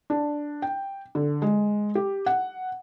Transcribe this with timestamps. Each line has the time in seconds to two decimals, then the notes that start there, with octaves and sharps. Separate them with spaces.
0.10 D4
0.62 G5
1.15 D3
1.42 G#3
1.95 G4
2.26 F#5